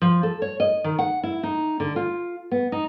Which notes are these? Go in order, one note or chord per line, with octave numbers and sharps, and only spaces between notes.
F3
A4
C#5
D#5
D#3
F#5
E4
D#4
D3
F4
B3
D#4